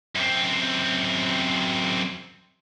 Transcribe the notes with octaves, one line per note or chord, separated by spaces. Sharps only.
F#2 C4